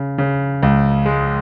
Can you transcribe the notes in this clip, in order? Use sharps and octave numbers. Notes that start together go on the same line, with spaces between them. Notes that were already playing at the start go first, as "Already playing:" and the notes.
Already playing: C#3
C#3
C#2
G#3